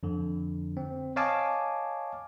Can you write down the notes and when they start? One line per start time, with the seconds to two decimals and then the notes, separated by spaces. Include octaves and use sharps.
0.03 F2 D3
0.77 C4
1.16 C#5 D#5 F5 G#5 A5 D6